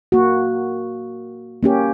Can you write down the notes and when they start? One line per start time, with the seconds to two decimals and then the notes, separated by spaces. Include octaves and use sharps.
0.12 A#3 F#4
1.63 A#3 C#4 G4